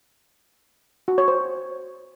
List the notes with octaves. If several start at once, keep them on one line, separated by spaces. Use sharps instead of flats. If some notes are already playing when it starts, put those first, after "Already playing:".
F#4
C#5
C5